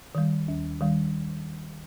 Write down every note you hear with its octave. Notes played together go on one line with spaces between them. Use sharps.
D#3 G3
D#2
D#3 G3